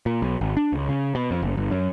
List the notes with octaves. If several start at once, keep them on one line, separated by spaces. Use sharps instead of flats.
A#2
B1
G#1
D4
C#2
C#3
B2
F2
F#1
G1
F#2